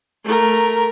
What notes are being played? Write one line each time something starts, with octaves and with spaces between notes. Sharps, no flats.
A3 A#4